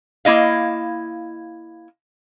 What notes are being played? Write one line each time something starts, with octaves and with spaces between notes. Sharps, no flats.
A#3 E4 D#5 F5